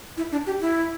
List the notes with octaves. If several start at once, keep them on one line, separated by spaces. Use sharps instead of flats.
E4
D4
G4
E4